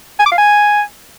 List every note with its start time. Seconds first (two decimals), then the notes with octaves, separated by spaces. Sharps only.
0.19 G#5
0.26 D6
0.32 F5
0.38 G#5